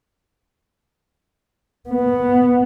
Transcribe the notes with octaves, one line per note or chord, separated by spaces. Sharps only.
B3